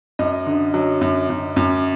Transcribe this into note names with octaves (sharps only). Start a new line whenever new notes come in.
F#2 D#5
D3
F#3
F#2
F#2
F#2